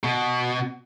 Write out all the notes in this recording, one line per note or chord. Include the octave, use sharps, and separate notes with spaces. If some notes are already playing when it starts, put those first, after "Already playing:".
B2